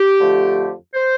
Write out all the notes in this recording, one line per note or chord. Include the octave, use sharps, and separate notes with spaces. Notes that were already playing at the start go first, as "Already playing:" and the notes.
Already playing: G4
F2 D3 F3 A3
C5